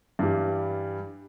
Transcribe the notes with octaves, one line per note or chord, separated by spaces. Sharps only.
G2 E3 G3